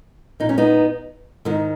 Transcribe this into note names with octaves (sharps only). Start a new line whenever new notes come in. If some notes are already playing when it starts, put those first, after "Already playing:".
A#2 D#4
C#4
B3 D#4
G#2 D#3